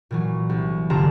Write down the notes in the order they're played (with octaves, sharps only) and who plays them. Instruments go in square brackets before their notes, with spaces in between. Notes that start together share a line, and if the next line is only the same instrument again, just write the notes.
[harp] A#2 E3 F#3
C2
G1 C3 F4 A5 A#5